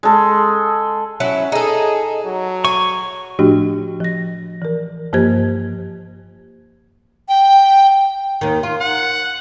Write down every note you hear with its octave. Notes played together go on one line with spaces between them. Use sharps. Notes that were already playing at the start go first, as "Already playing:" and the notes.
G#3 A4
F#3 C#4 E4
D#4 G#4 A4
F#3
G#5 C#6
A2 F3 A3 D4 F#4 G4
F3 A#6
E3 A#4
G2 F3 A#3 G4 C5 G#6
G5
D#2 D#3
F4
F#5